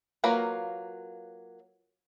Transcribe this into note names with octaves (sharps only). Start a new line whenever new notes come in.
F#3 A#3 F4 A#4 B4